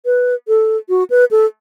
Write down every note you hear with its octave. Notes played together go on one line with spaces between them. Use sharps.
B4
A4
F#4
B4
A4